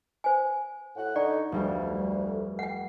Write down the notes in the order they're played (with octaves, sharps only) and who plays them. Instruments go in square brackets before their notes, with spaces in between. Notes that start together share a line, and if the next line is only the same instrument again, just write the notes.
[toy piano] C5 G#5
[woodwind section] A2 F#5
[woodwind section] D3 D#4 [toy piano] D5 [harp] C#6
[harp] F1 G3 [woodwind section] D2
[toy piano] F#5 G5